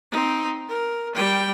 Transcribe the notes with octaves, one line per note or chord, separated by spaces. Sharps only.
C4 D#4
A#4
G3 G5